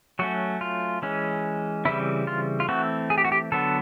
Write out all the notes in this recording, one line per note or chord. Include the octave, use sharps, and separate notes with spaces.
F#3 A3 C#4 F#4
F4
E3 G#3 C#4
C#3 E3 G3 C4 E4
F4
F4
E3 A3 C4 F#4
G#4
G4
F#4
G4
D3 F#3 B3 A4